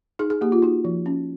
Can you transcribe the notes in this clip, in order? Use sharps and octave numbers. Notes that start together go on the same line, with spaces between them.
D#4 G#4
G#4
A#3 G4
F4
D#4 F#4
F3
C#4